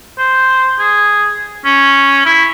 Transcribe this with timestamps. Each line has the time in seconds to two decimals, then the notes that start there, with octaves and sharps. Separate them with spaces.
0.18 C5
0.79 G#4
1.65 C#4
2.26 E4